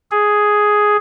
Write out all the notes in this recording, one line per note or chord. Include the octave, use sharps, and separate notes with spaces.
G#4